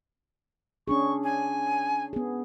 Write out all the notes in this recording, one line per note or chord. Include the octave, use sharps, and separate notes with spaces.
C#4 D4 G#4 C#6
G#5
B3 G#4